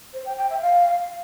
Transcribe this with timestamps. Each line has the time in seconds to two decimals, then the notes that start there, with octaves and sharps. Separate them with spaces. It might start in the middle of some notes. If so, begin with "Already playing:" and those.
0.13 C5
0.25 G5
0.37 G5
0.49 E5
0.61 F5